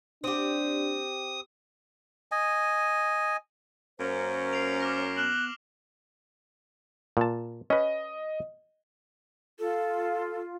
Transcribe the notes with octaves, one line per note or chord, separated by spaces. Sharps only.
C4 D4 G4 D#6
D#5 G#5
F#2 A#3 C#4 C5
C7 D7 F7
D6 F6 A#6
B3 F6 F#6 E7 F#7
A#2 A5
C#4 B4 D#5
F4 A4